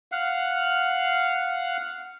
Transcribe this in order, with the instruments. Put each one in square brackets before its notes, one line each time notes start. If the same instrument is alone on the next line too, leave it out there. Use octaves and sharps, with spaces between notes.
[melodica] F5 F#5